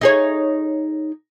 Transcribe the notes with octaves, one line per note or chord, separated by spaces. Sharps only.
D#4 G#4 C#5